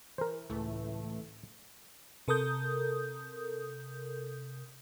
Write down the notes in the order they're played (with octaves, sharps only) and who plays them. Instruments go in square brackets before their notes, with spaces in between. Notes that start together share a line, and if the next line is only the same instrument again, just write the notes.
[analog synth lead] E3 [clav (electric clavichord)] A#4 C5
[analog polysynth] C#2 E3 A3 [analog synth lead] A2
[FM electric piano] C3 A4 A#4 D#6 G6